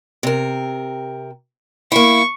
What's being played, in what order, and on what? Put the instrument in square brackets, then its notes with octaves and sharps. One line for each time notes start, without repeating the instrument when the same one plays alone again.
[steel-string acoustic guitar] C3 A#4
[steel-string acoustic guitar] A#3 E4 [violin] C#6